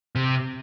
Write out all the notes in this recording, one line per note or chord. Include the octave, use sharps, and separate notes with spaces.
C3